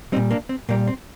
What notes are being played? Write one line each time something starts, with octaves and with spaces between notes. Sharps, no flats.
A#2 G3 C4 D#4
A#3 D4
C4
A#2 G3 A#3
C4